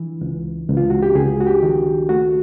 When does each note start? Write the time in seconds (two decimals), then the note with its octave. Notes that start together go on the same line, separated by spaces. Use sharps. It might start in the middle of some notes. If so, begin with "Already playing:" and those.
Already playing: E3
0.21 C#2
0.68 C#2
0.77 F4
0.90 F#4
1.03 G4
1.15 C#2 G#4
1.41 F#4
1.47 G4
1.63 D#3
2.09 A3 F#4